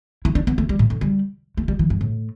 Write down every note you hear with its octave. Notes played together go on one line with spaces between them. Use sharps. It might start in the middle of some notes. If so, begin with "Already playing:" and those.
E4
D4
B3
A3
G3
A2
D3
G3
A3
G3
E3
G2
A2